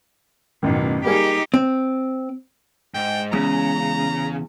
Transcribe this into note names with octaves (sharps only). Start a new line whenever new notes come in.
A1 F#2 B2 D#3
G3 A#3 D#4 G4 G#4
C4
G#2 G5
E2 C#3 G#3 B3 C#4 A#5